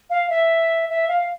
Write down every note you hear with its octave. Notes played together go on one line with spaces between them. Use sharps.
F5
E5
E5
F5